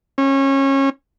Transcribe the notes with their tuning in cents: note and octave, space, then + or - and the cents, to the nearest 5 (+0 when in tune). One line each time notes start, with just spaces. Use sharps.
C#4 -25